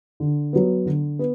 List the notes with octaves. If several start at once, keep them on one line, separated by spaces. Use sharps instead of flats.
D3
F#3 B3
D3
B3